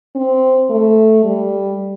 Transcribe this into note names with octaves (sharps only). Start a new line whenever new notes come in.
C4
A3
G3